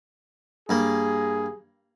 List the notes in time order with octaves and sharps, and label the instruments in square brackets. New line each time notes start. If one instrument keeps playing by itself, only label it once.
[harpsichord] G2 A#3 [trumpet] G#4